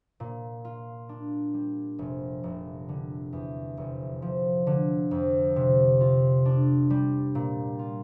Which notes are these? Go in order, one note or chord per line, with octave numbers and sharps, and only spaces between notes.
A#2
F4
D4
G3
F1
F1
D3
E2
F1
F3
D3
F2
C3
F4
D4
G3
A#2
F4